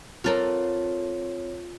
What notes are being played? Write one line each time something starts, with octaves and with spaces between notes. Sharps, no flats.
C4 F4 A4 A#4 C#5